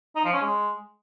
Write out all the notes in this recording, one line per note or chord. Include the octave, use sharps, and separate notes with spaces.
D#4
F3
C#4
G#3